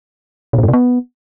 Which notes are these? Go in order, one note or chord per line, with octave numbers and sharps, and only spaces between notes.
B2
A#2
G2
C3
B3